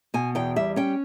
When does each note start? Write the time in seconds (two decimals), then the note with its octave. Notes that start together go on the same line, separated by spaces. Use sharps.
0.14 B2 G#5
0.35 E2 G5
0.56 G3 E5
0.76 C#4 G5